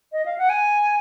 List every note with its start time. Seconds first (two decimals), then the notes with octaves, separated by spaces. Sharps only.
0.12 D#5
0.26 F5
0.38 F#5
0.49 G#5